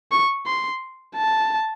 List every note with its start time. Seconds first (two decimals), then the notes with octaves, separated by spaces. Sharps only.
0.12 C#6
0.46 C6
1.16 A5